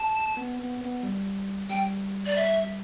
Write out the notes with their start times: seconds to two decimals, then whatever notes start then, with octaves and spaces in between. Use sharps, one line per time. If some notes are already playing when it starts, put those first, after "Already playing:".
Already playing: A5
0.37 B3
0.59 B3
0.81 B3
1.03 G3
1.69 G3 G5
2.26 D5
2.36 E5